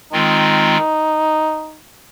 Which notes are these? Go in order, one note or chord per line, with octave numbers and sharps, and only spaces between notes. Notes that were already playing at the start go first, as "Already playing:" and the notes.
D#3 G#3 C4 D#4 F4